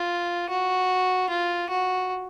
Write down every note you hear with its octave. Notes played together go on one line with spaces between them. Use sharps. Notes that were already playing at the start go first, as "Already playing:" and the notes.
Already playing: F4
F#4
F4
F#4